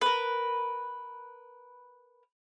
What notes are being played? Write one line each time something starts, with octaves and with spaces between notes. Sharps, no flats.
A#4 B4